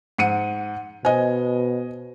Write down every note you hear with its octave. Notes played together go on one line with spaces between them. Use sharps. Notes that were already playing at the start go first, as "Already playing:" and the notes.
G#2 F#5 C#7 D#7
B2 C5 D#5 G#5